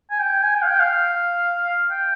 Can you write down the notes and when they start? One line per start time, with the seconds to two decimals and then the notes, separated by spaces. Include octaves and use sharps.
0.11 G#5
0.19 G5
0.42 G#5
0.55 G5
0.62 F5
0.67 G5
0.80 F5
1.91 G5